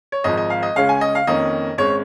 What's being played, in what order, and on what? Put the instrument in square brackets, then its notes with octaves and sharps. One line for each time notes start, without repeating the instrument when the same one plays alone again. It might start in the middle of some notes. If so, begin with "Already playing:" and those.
[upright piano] C#5
G#1 G#2 F3 D#5
D#5
F5
D#5
C#2 C#3 G#3 C#4 F5
G#5
D#5
F5
F2 D#3 A#3 C#4 D#5
G#1 G#3 C#4 C#5